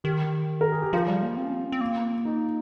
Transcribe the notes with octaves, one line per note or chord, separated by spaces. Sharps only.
D#3 G4
A#4
G#4
G4
F3 F4
G3
A#3
C4
C#4
C4
C#4
C4
A#3
D#4